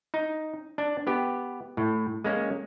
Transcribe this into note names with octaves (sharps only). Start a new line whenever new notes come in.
D#4
D4
B3 G4
A2
G#3 A#3 C#4